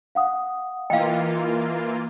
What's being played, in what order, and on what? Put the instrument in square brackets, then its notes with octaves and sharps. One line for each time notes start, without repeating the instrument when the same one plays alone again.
[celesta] F5 F#5 D#6
[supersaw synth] E3 A#3 F4 [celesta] D#5 [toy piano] F5 G5